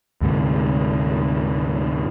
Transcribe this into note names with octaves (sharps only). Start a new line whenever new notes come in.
D2 G#2 C3